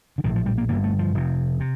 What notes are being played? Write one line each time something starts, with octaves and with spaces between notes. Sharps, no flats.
D3
A#1 A2 D#3
F3
G3
A#3
G1 G2 D3 A#3
A3
F3
F1 F2 C3
C3